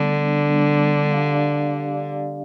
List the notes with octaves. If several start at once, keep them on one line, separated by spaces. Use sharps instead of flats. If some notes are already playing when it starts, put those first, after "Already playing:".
Already playing: D3 G3 B3 D4
G3 B3 D4
D4 G4 D5 F5
D4 G4 D5 F5